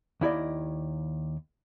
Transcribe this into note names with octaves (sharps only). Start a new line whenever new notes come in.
D#2 E4 D5 D#5